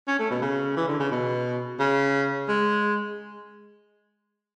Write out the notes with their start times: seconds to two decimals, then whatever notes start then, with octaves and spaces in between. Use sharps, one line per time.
0.08 C#4
0.19 A3
0.30 B2
0.42 C#3
0.77 E3
0.88 D3
1.00 C#3
1.11 B2
1.80 C#3
2.48 G#3